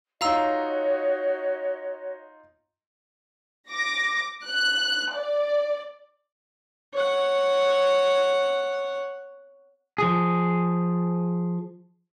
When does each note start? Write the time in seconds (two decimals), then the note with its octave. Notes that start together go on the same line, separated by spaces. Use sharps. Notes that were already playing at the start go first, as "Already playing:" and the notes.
0.21 D#4 F4 F#4 C#5 D#5 F5 A#5 E6
3.70 D6 A#6
4.46 F#6
5.14 D5
6.94 C#5 F#5
9.98 F3 G#4